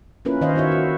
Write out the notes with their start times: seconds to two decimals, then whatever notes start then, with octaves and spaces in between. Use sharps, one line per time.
0.25 A#3 C#4 E4 F4 A#4 B4
0.41 D#3 C5 C#5 D#5 F5
0.56 E4 F#4 C#5 E5
0.72 F#4